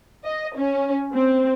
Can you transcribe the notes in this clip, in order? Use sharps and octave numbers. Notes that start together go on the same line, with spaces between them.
D#5
C#4
C4